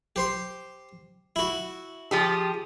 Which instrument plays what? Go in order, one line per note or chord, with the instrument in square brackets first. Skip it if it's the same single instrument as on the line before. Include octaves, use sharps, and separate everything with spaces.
[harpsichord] G4 C5 C6
E4 F#4
[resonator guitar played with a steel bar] F3 G4 G#4